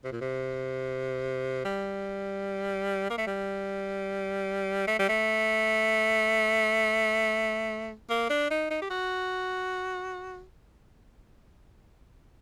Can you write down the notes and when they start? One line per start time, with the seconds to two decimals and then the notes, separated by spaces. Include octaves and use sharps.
0.04 C3
0.12 A#2
0.21 C3
1.65 G3
3.10 A#3
3.18 A3
3.27 G3
4.88 A3
4.99 G3
5.09 A3
8.10 A#3
8.30 D4
8.51 D#4
8.71 D#4
8.82 G4
8.90 F#4